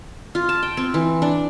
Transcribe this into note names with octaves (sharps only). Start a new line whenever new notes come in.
F4
A5
G5
C4
E3
D4